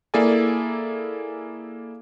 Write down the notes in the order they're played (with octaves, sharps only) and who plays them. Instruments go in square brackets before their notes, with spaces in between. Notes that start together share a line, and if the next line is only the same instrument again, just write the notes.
[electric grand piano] A#3 E4 G#4 A4 D5 G#5